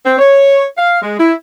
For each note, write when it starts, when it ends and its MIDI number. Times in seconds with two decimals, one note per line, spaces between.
0.05 0.17 60
0.18 0.65 73
0.77 1.00 77
1.02 1.16 56
1.19 1.33 64